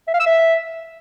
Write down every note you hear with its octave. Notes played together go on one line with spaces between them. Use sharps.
E5
F5
E6
E5